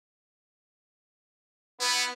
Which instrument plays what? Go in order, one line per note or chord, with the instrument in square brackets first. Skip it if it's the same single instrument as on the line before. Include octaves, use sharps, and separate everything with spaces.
[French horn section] B3 [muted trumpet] E4